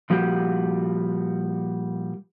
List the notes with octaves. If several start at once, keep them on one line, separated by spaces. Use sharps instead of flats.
A#2 F3 G3 F#4 G4